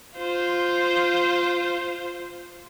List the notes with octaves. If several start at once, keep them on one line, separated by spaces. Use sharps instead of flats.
F4 C5